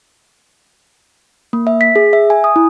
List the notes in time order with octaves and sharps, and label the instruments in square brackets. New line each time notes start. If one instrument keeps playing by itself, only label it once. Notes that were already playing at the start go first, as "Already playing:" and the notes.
[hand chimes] A#3
E5
B6
G#4
E5
G#5
D#6
E4